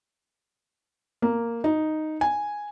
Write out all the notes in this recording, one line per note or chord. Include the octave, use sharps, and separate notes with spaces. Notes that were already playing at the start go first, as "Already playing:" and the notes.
A#3
D#4
G#5